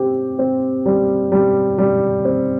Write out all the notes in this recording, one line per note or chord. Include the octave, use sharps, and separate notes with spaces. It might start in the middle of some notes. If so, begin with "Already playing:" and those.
Already playing: C4 G4
C4
G3
G3
G3
C4